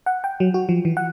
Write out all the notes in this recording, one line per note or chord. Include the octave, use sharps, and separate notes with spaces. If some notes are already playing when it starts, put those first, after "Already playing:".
F#5
G5
F#3
F#4
F3
E3
F#5